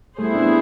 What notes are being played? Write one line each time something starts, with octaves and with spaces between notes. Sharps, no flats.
G3 A3 B3 E4 G#4 C5
C4 D4